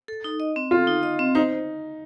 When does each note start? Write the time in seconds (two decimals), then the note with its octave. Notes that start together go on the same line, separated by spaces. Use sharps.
0.08 A4
0.24 D#4
0.40 D#5
0.56 C4
0.71 F4 A4
0.87 D#4
1.03 D#5
1.19 C4
1.35 D#4 C5